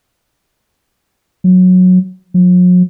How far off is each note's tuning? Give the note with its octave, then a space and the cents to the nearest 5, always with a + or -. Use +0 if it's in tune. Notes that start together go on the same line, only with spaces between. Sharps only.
F#3 -15
F#3 -45